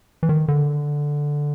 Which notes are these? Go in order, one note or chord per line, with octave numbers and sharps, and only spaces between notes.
E3
D#3
D3